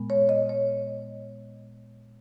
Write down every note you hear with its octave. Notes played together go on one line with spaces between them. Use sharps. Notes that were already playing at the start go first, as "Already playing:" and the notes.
Already playing: A#2 G#3 B3
C#5
D#5
C#5